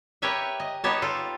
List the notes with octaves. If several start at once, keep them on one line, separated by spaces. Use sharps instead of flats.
G4 A#4 B4 C#5 E5 G5
D#5
B3 D#4 G4 C#5 A5
F4 A4